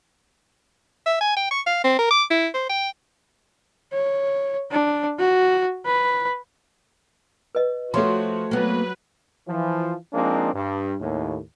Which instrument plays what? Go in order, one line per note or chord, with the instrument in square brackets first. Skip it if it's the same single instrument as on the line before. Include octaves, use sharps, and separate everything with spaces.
[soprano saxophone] E5
G#5
G5
C#6
F5
C4
A#4
D6
E4
C5
G5
[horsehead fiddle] C#5
D4
F#4
B4
[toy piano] B4 D#5
[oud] F3 [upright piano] A3 C#5 C6 [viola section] F#4
[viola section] F#3 B4 [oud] A#3 B3
[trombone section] E3 F3
F3 G#3 A#3 C4 D4 D#4
G2
D#2 A2